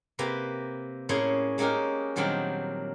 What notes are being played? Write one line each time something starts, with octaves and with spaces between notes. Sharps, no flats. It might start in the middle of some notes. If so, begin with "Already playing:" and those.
C3 A#3 G4 B4 A#5
A2 A#3 C#4 G#4 C#5 C6
G#3 A#3 C#4 D#4 G4 A#4
A#2 D#3 F#3 G3 C4 D4